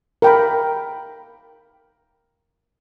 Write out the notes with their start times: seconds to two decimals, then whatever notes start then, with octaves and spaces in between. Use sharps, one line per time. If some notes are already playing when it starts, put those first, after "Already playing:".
0.22 A#4 G5 B5